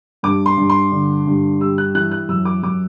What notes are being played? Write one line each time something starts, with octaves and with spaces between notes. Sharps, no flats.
G2 D6
C6
G2
C6
D3
G2
G3 E6
F#6
E3 F#6
F#6
F#2 E6
D6
F#2 D6